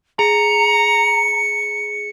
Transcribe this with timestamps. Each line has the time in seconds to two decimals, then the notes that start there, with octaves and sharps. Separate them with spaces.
0.19 G#4 A#5 C#7